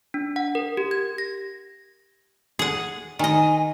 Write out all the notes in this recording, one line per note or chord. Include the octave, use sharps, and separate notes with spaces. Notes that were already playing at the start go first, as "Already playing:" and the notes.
D4
F#5
A#4
G4
G#6
A#6
G#4 F#5
D#3 D#5 G#5